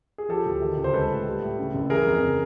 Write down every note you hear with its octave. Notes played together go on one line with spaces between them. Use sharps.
G#4
F3 G4 A4
D2
D#3
C#2
C5
G#3 A4 B4
A2
G3
A2
C#3
F#1
E3 G#4 A#4
F2
C#3